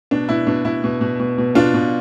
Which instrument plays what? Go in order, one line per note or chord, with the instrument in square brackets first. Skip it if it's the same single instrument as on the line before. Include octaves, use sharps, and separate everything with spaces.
[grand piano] B2 D4
B2 E4
B2 D4
B2 E4
B2
B2
B2
B2
B2 D4 F4
B2